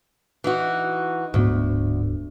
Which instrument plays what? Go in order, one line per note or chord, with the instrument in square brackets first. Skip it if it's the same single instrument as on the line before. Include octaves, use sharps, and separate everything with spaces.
[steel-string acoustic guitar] E3 D#4 F#4
[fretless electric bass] D1 G#2 B3 [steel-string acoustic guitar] D2